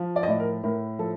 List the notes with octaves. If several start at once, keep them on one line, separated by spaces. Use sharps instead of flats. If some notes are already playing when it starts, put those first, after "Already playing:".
Already playing: F3
D5
D#5
A2 D5
A#4
A2 A#4
F3 A4